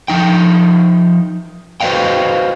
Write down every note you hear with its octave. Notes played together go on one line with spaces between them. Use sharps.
F3 D#4 G5
F#4 B4 C5 D#5 F5 G5